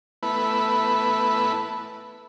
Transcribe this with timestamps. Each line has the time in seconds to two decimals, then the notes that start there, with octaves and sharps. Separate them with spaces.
0.23 A3 B3 E4 B4